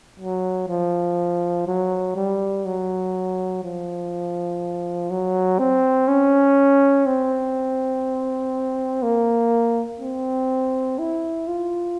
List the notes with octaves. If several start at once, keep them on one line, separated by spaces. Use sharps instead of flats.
F#3
F3
F#3
G3
F#3
F3
F#3
C4
C#4
C4
A#3
C4
E4
F4